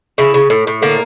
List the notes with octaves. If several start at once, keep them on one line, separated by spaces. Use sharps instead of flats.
C#3 E4
C#3
A2
A2
D3 A#3